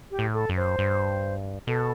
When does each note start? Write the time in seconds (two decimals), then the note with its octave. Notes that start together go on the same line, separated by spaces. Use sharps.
0.11 G4
0.19 A2
0.34 A4
0.49 F#2
0.56 C5
0.79 G2
1.67 B2 A4